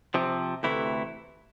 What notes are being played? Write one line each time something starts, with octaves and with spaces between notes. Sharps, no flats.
C3 F3 C4
D2 C3 E3 A3 E4